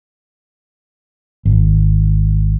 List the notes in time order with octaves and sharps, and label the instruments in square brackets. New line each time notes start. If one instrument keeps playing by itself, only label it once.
[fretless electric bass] G#1